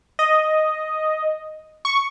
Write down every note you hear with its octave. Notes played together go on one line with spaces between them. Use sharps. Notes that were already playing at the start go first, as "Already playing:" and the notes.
D#5
C#6